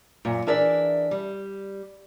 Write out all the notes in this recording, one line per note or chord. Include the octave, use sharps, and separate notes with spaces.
F#2 A#2
E3 D4 G#4 A#4 D5 E5
G3